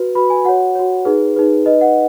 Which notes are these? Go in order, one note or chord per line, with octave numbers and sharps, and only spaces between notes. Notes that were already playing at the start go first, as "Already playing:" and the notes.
Already playing: F#4 B4
F#4 B4 B5
G#5
F#4 C#5 F#5
F#4 C#5
D#4 G#4 B4
D#4 G#4 B4
D#4 B4 D#5
F#5